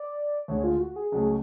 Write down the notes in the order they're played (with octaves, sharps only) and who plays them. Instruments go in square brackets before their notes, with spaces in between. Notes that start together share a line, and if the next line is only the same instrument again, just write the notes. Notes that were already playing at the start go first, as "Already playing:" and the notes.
Already playing: [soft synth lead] D5
[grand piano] D2 D3 G#3 [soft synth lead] C#5
[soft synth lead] F4
F#4
G#4
[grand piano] C#2 C#3 F#3 A3 C#4 [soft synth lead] G#4